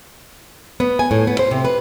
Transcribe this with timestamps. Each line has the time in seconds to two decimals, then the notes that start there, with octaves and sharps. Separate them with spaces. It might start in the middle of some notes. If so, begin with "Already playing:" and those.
0.80 B3
0.99 G#5
1.11 A2
1.27 B3
1.39 C5
1.51 C3
1.65 B4